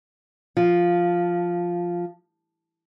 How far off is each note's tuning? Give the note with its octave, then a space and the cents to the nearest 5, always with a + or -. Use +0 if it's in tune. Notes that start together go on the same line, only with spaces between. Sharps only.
F3 +0 F4 +0